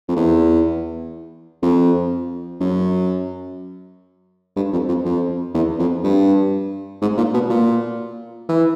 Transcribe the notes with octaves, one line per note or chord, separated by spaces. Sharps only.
F2
E2
F2
F#2
G2
F2
F2
F2
E2
F2
G2
G#2
A#2
B2
A#2
E3